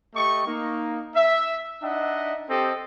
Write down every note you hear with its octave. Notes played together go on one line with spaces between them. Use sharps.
A3 G4 D#5 C#6
A#3 D#4
E5
D4 D#4 D#5 E5 F#5
C4 G4 A4 D#5 G5